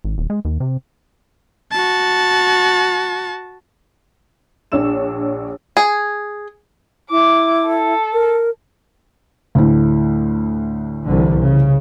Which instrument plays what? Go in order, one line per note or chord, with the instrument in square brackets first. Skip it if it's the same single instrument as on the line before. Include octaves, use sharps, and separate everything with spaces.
[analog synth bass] G#1
D#1
G#3
D#2
C3
[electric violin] F#4 A5
[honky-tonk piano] A#1 D4 C#5 E6 E7
[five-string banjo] G#4
[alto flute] E4 [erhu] D6
[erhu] A4
[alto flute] A#4
[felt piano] D2 A2
[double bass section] C2 D3 E3
C#3